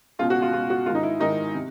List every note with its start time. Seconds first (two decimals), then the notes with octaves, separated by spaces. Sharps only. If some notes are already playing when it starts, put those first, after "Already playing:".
0.19 C#2 B2 F4
0.30 F#4
0.42 F4
0.53 C#2 B2 F4
0.70 F#4
0.86 G#2 D#3 F4
0.95 D#4
1.03 E4
1.20 G#2 D#3 D#4
1.54 C3